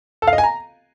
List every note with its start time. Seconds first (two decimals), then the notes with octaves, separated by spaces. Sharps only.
0.22 A4
0.28 F5
0.33 D#5
0.38 G#5
0.43 A#5